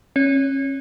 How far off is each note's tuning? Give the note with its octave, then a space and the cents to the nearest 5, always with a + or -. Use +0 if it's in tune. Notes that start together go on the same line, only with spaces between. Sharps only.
C#4 -30 C#5 +25